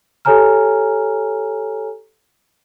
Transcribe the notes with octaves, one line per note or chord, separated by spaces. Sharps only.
G4 A4 C#5 G#5 A#5 F6